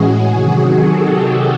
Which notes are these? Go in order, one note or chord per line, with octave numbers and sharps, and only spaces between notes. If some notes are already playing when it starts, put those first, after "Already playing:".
Already playing: A2 E3 G#3 C#4 F#4 G#4
C3 D#3 F#3 F#4 G#4
G4 A4